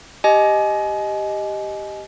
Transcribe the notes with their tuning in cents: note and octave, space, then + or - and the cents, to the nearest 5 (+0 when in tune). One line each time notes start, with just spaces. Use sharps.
G4 +0 D#5 +0 G#5 +35